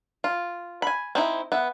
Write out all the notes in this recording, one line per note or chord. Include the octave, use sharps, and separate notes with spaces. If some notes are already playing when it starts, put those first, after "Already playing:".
F4
G#5 B5
C4 D#4 E4
B3 E5